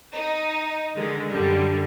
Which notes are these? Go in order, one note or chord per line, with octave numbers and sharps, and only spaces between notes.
D#4
D3 D#3 G#3
F#2 D3 G3